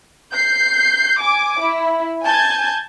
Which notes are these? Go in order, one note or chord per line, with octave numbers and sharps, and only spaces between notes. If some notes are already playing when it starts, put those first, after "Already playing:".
G6 C7
G#5 D6
E4
G#5 A5 G6 G#6